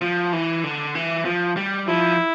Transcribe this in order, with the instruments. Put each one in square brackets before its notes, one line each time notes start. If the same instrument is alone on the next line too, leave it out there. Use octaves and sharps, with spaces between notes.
[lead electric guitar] F3
E3
D3
E3
F3
G3
[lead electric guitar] F3 [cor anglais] E4